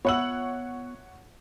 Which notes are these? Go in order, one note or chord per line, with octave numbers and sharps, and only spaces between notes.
B3 F4 C#5 E5 F#5 E6 F#7